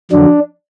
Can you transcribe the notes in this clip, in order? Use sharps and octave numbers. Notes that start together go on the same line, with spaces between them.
F2 D3 F#3 D4